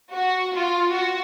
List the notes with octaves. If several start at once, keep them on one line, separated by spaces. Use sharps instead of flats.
F#4
F4
F#4